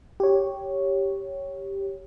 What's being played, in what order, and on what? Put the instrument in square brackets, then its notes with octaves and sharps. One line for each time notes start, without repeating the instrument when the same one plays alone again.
[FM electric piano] G4 C#5